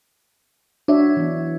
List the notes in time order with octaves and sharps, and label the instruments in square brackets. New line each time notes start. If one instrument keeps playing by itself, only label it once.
[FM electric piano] D4 [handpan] F#4 C#5 E5
[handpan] E3 B3